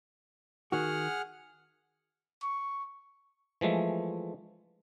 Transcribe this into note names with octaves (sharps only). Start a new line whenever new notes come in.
D#3 F#4 G#4 F#5 F6
C#6
E3 F3 G#3 A3